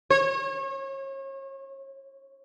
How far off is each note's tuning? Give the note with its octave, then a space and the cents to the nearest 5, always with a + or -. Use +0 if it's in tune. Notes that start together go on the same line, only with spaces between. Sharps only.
C#5 -35